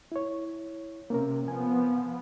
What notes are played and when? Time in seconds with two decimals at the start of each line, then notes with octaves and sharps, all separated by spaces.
0.12 E4 C#5
1.10 C3 A#3 C#4 A#4
1.48 F3 B3 G#5